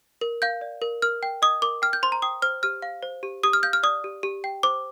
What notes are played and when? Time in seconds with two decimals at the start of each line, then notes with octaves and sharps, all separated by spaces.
0.21 A#4
0.42 F5 G6
0.61 D5
0.82 A#4
1.02 A#4 F6
1.23 G5
1.42 D#5 D#6
1.62 A#4 D6
1.82 G5 F6
1.93 G6
2.03 C5 C6
2.12 A#5
2.22 G5 D#6
2.42 C5 F6
2.63 G4 F6
2.82 F5
3.03 C5
3.23 G4
3.43 G4 D#6
3.53 F6
3.63 F5 G6
3.73 F6
3.83 D5 D#6
4.04 G4
4.23 G4
4.44 G5
4.63 C5 D6